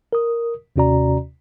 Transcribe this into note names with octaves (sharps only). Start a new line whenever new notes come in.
A#4 D#6
D#2 C3 C#4 F#4 D5 A#5